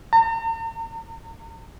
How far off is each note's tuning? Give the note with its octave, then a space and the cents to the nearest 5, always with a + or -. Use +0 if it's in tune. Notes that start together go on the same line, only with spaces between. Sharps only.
A#5 -45